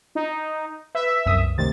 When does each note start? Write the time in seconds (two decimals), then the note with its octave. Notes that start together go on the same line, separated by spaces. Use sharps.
0.15 D#4
0.95 B4 E5
1.26 C2 F#2 D#6
1.58 D2 C3 D#3 A6